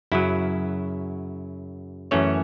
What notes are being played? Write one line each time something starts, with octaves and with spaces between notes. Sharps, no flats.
F#2 C#3 F#3 E4
F#2 E3 A3 C#4 C#5